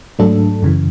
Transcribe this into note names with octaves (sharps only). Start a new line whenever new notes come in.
G#2 F#3 A3 D4 A4
F#2 C#3 E3